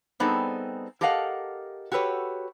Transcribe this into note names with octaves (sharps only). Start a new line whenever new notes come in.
G3 B3 C4 D#4 G#4 A4
G4 A4 A#4 D#5 F5 F#5
F#4 G4 A4 B4 C#5